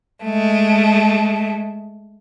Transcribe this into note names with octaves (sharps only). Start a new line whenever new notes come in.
G#3 A3